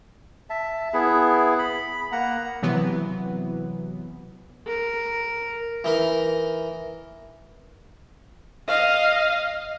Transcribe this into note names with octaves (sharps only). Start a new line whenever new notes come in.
E5 A5
B3 E4 G#4
B5
A#3 F#5 A#5
C3 E3 F#3 B3
A#4
E3 D#4 A#4
D#5 F5